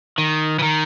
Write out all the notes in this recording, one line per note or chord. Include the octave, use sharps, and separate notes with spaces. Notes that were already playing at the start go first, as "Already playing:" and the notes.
D#3
E3
D#3